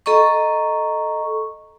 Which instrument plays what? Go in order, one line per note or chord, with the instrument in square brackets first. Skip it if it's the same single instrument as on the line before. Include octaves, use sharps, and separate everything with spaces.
[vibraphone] A4 D#5 A#5 C#6